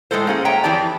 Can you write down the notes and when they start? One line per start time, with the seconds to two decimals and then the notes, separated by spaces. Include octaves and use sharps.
0.11 A2 G#3 A3 A4 C5
0.27 A#3 C#4 G#4
0.45 C#5 E5 G5 A#5
0.63 F2 E3 C4 G4 D5 A5